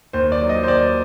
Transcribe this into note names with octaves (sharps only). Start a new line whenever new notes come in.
D#2 C5
D5
F#3
D#5
C5
D#2 D5